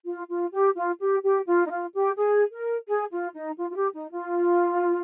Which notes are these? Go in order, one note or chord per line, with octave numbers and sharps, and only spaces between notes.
F4
F4
G4
F4
G4
G4
F4
D#4
F4
G4
G#4
A#4
G#4
F4
D#4
F4
F4
G4
D#4
F4